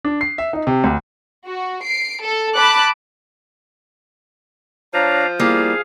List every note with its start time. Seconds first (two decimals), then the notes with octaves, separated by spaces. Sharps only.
0.05 D4
0.21 C7
0.38 E5
0.53 D#4
0.67 C3
0.84 D2
1.46 F#4
1.83 C7 D7
2.22 A4
2.56 A5 B5 D6 F#6
4.94 F3 D4 C#5 F5 A#5
5.40 G3 A#3 E4 G#4 F5